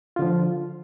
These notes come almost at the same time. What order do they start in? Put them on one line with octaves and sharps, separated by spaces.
F4 D3 F3